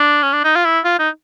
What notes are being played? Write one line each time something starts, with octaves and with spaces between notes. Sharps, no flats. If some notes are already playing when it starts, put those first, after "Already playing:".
Already playing: D4
C#4
D4
D#4
F4
E4
F4
D#4